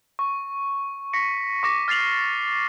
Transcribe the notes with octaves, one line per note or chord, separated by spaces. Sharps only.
C#6
C#6 A#6 B6 C#7
C#6 D6 A#6 C#7
F6 A6 C7 F7 F#7